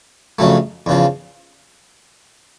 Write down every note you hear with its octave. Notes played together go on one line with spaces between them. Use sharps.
F2 C#3 F#3 A3
E2 C#3 F3